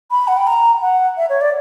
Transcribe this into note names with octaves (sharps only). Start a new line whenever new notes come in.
B5
F#5
G5
A#5
F#5
E5
C#5
D5